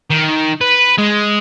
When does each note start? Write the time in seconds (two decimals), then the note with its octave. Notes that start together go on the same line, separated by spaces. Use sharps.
0.11 D#3
0.61 B4
0.98 G#3